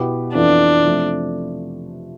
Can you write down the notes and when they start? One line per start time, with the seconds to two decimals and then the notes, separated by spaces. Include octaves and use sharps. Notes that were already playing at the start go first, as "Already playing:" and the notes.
Already playing: B2 B3 E4 G4
0.34 F2 E3 B3 D4 F4 A4
0.84 C3 F3 A3